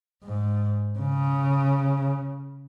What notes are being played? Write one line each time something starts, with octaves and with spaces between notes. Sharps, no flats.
G#2
C#3